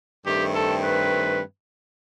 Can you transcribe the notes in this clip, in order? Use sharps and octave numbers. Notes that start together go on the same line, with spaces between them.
G2 D#3 A3 C4 G4
A4
B4